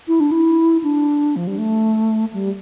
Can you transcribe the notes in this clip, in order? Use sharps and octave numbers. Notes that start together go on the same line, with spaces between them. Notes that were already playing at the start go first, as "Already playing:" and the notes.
E4
D4
E4
D4
F3
G3
A3
G3